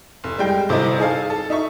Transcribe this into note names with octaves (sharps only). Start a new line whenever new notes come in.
F1
G3 G#3 G5
G1 C3 C4 E4 D#5
D#4 G#4 A4 F5
A4
D#4 E5 C#6